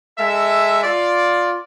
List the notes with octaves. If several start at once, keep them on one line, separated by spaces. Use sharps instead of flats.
G#3 A4 E5
F4 D5